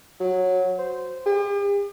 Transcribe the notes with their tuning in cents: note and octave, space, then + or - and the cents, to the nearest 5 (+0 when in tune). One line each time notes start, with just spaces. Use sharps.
F#3 -10
C5 -15
G4 +45